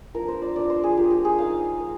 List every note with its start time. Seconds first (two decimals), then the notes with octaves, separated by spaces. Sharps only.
0.14 F3 A#3 D4 A#4
0.28 C5
0.42 D5
0.56 F3 A#3 D4 D5
0.70 C5
0.83 G#4
0.97 F3 A#3 D4 G4
1.11 G4
1.25 G#4
1.38 A#3 D#4 F5
1.80 A#3